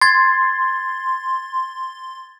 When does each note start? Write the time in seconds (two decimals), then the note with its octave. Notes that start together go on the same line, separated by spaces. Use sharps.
0.01 C6 G#6 A6